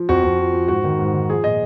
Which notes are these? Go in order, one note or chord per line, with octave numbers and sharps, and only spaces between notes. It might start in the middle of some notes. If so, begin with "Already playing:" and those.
Already playing: F3
F2 F#4
F2
F3
F3
G#2 F#4
D#3
G#2
D#3
F3 G#4
A#2 D#5